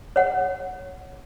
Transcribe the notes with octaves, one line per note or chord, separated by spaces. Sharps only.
C#5 F#5